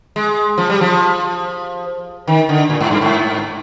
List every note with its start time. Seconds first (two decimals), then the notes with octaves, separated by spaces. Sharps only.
0.16 G#3
0.58 F3
0.70 G3
0.81 F3
2.27 D#3
2.49 D3
2.70 A#2
2.80 G#2
2.91 G2
3.01 G#2